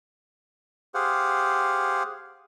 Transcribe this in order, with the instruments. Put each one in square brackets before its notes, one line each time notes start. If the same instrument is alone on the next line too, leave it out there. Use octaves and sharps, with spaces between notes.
[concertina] G4 G#4 C5 F5 F#5